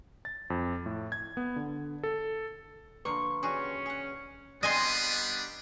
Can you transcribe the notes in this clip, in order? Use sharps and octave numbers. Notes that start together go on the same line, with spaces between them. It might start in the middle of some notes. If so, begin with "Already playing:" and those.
A6
F2
A2
G#6
B3
D3
A4
D3 F3 A#3 B4 A#5 C6 C#6
G3 C#4 F#4 G#4
G#4 F#5
G3 B3 D4 D#5 G#5 C6